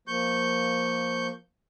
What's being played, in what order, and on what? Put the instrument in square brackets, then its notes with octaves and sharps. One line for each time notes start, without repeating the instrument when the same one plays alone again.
[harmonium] F3 A#3 [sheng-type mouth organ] C#6 G6